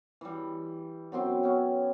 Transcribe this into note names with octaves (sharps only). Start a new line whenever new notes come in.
E3 G3
F#2 B3 C4 G5
B3 C#4